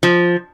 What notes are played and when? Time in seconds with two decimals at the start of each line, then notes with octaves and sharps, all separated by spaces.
0.03 F3